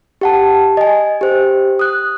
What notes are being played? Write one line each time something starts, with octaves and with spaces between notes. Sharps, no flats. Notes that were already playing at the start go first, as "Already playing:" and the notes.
G4 F#5 A5
D#5 G#5
G4 C5
D#6 F#6